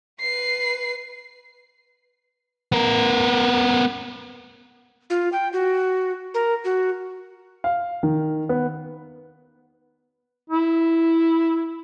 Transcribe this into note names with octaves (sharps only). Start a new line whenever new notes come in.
B4 C7
B3 A#4
F4
G5
F#4
A#4
F#4
F5
D#3
B3
E4